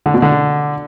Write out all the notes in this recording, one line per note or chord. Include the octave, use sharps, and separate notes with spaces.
D3
B2
D3